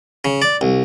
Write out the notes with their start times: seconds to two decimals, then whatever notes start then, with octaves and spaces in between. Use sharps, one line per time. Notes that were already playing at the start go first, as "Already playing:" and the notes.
0.25 C#3
0.42 D5
0.61 C2